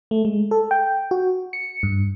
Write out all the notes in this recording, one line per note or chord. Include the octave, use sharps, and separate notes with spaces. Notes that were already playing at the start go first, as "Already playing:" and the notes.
A3
G#3
A4
G5
F#4
C#7
G2